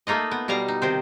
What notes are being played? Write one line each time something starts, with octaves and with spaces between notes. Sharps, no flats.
A3 A#3 D#4 F4 D#5
B3
B2 G3 F5 A#5
D#4
C3 D#3 C5